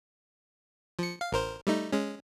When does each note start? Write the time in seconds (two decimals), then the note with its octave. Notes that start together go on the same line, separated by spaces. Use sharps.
0.99 F3 C#7
1.21 F5
1.32 A1 A#4 C5
1.67 G3 A3 D#4
1.93 G#3 C#4